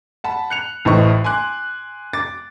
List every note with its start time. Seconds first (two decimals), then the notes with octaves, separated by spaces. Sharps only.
0.24 F#5 A5 B5
0.50 F#6 C#7 F7
0.85 A1 A2 C5 D#5 C#6
1.24 G#5 C6 D6 F#6
2.13 D6 A6